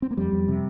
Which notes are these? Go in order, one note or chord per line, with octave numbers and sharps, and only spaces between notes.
C4
A#3
F2 G3
F2
C3